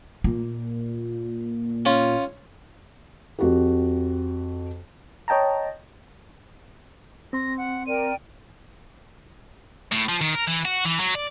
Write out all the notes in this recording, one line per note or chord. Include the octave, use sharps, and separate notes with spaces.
A#2 A#3
C#4 F4
F2 F#4 G4
C#5 D#5 G5 A5 A#5
C4 C6 A#6
F#5
A#4 D5 G5 D#7
A2
F3
D#3
A#4
E3
F#4
E3
F#3
D5